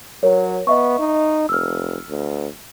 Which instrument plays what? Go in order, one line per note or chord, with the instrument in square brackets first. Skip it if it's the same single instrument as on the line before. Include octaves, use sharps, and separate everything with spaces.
[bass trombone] F#3 [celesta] A#4 C#5
[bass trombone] B3 [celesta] D#5 E5 C#6
[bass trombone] D#4
[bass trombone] F1 [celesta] E6 F6
[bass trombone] D2